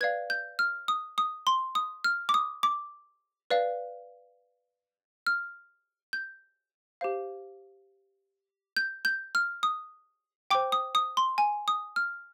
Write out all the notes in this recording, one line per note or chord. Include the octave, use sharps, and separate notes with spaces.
B4 D5 F5 G#6
G6
F6
D#6
D#6
C6
D#6
F6
D6
D#6
D6
B4 D5 F5
F6
G6
G4 C5 F5
G6
G6
F6
D#6
C5 G5 D6
D#6
D#6
C6
G#5
D#6
F6